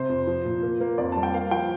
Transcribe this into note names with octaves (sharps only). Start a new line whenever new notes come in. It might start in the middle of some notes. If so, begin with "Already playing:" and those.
Already playing: C3 C5
F2
F3
A#2
A#3
A#3
F2 D5
G3 A5
G5
A#3 F5
F3 G5